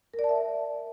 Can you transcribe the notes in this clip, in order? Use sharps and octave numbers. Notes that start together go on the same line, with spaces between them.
A#4
D5
A5
E5